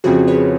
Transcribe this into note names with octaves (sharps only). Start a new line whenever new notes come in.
F2 C#3 F3 F#4 G#4
B4 C#5